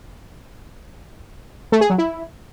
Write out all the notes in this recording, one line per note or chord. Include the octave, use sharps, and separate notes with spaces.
A3
G#4
F#3
E4